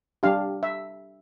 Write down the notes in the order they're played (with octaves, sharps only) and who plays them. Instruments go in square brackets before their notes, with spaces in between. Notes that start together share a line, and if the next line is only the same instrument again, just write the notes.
[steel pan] G3 D4 G4 F5
E5